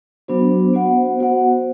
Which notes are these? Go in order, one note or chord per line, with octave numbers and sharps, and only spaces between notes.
F#3 B3 D4 F#4 C5
B3 F#4 C5 F#5
B3 F#4 C5 F#5